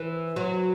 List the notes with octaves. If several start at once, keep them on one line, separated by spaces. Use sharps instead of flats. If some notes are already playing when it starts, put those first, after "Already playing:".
Already playing: E3
F#3